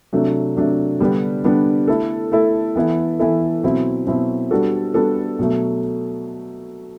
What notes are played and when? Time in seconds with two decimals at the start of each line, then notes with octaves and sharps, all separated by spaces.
0.13 C3 F#3 A3 D4
0.57 C3 F#3 A3 D4
1.01 D3 G3 B3 D4 G4
1.44 D3 G3 B3 D4 G4
1.88 A3 E4 A4
2.32 A3 E4 A4
2.76 E3 B3 E4 A4
3.19 E3 B3 E4 A4
3.63 B2 F#3 C4 E4
4.07 B2 F#3 C4 E4
4.51 G3 B3 D4 F#4 A4
4.94 G3 B3 D4 F#4 A4
5.39 B2 F#3 A3